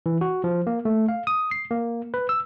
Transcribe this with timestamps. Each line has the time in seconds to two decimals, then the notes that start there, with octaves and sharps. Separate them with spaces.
0.06 E3
0.21 F#4
0.44 F3
0.67 A#3
0.85 A3
1.08 F5
1.27 D#6
1.51 C7
1.71 A#3
2.14 B4
2.29 E6